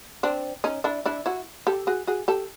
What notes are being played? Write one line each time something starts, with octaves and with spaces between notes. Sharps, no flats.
C4 D4
C#4 D#4
D4 E4
D4 E4
E4 F#4
G4 A4
F#4 G#4
F#4 G#4
G4 A4